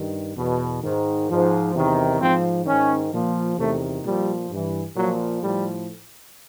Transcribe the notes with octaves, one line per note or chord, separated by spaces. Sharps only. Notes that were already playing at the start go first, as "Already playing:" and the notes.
Already playing: G2 D#3
E2 B2
G#2 D#3
G#2 F3
E2 C3 D#3
G#2 F3 C4
G#2 D#3 C#4
A#2 F3
E2 C3 D#3 A3
A#2 F3 G3
G2 E3
A#2 F3 F#3
A2 F3 G3